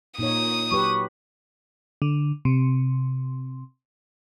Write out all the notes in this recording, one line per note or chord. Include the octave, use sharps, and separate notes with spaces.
A#2 D#4 C#5 D#6
F#3 G4 B4 C#6
D3
C3